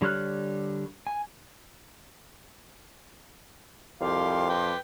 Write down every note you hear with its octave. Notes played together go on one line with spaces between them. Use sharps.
D3 G3 C#5 F6 F#6
G#5
C2 F2 G4 F5 C6 D6
B4 G5